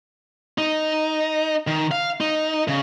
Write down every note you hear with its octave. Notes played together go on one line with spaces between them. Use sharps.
D#4
D#3
F5
D#4
C#3